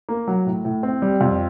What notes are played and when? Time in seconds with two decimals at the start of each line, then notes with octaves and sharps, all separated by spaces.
0.09 A#3
0.28 F#3
0.46 A2
0.65 A2
0.83 C4
1.02 G3
1.21 F2